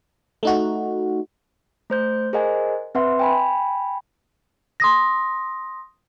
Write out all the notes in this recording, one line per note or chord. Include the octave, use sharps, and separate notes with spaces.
A3 D#4 F#4
A3 C5 G6
G#4 A#4 C5 D#5 F#5 G#5
C4 B4 E5 F#5 C6
G5 G#5 B5
C6 D#6 A#6